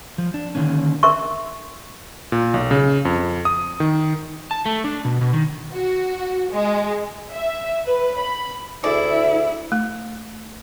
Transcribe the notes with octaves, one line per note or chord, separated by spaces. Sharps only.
F3
D4
D3 D#3 A#3 C#4
A#4 E5 C6 C#6
A#2
B1
C#3
F2
D#6
D#3
A5
A3
D4
B2
B2
D#3
F#4
G#3
E5
B4
B5
D2 E4 G#4 D5 E5
A3